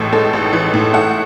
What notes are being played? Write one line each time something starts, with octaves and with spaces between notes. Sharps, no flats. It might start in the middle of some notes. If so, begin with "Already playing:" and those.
Already playing: A1 A2 E3 G#3
G#3 A4
A1
E3
A2
A3 F#5